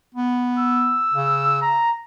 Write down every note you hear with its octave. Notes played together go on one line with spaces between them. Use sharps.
B3
E6
C#3
A#5